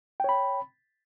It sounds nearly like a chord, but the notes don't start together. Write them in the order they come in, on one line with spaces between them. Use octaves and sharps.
G5 C#5 B5